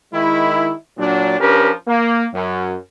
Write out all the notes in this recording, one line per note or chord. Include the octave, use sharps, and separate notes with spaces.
D#3 G#3 E4
A#2 F#3 D4
F3 C#4 D4 G4 A#4 B4
A#3
F#2